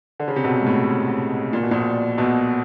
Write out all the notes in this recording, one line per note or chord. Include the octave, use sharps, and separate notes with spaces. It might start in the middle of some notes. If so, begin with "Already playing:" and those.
D3
C#3
C3
B1 B2
G#2
A2
A#2
B2
A#1 A#2
B1 B2